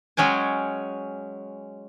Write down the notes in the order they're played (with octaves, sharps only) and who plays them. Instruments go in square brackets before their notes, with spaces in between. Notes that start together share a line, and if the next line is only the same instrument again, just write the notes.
[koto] F#3 G#3 C#4 G5 G#5